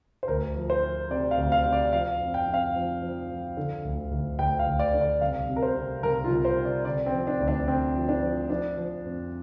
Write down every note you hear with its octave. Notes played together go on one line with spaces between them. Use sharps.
C5
D2 A#4
F3
C5
F3
C3 D5
F5
D2
F5
C3
D5
F3 F5
F2
G5
F2
F5
F3
F3
F3
D3
D2
D2
D2 G5
F5
D2
D5
D3
D5
C2 F5
C3
A#4
C5
C3
C2 A#4
F4
C2
C5
C3
D5
D3 D5
C4
F3
D4
D2
D4
D3 C4
F3
D4
F3
F3 D4
F3
F2